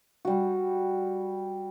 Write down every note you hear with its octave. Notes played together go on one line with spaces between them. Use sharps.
G3 F#4